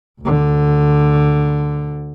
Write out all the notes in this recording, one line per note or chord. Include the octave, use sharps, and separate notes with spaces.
D2 D3